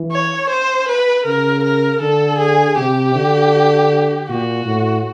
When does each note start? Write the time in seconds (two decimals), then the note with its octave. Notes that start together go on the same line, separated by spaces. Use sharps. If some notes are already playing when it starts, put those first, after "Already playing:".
Already playing: E3
0.12 C#5
0.50 C5
0.89 B4
1.26 C#3 A#4
1.64 A#4
2.01 D3 A4
2.39 G#4
2.77 C3 G4
3.15 D3
4.29 A#2 F#4
4.66 A2